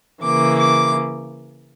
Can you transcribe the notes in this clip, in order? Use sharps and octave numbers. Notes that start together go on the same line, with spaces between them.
C#3 E3 A#3 D6
D6